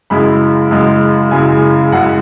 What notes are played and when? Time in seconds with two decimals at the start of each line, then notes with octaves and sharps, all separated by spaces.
0.10 F#2 C#3 G#3 E4 B5
0.71 F#2 C#3 G#3 E4
1.31 F#2 C#3 G#3 E4 G#5
1.92 F#2 C#3 G#3 E4 F#5